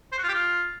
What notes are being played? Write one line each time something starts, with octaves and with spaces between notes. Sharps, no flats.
C5
F#4
F4
G4
F4